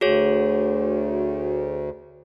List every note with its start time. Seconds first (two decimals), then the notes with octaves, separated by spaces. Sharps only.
0.01 D2 F#4 G#4 C#5